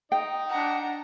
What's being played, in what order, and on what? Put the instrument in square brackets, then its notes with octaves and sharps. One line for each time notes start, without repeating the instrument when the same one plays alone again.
[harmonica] D#4 D#5 [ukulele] G5
[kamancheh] D4 A#5 [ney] F#5